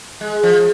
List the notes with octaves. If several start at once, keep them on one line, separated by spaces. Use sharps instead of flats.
G#3
F3